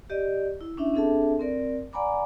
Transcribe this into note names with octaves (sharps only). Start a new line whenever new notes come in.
G4 D5 D#5
E4
C#4 D4 E4 E5
C4 D4 G#4 A4 E5 A5
C4 A#4 D5
D5 F#5 G#5 A#5 B5 D6